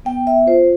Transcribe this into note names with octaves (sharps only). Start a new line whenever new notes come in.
B3 G5
E5
F4 C5